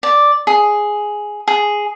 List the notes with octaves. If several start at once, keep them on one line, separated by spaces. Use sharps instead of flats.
D5
G#4
G#4